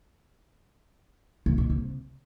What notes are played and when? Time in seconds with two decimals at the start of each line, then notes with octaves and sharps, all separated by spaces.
1.46 C3
1.58 B2
1.70 C3